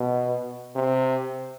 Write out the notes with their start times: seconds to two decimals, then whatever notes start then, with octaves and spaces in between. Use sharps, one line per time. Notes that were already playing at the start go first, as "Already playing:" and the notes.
Already playing: B2
0.75 C3